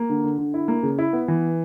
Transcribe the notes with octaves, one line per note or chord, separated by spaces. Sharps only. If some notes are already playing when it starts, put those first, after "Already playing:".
Already playing: A#3
D3
D3
D3
E4
A#3
C#3
E4
B3
E3